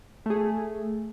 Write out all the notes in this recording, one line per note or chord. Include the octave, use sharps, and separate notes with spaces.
A3 G#4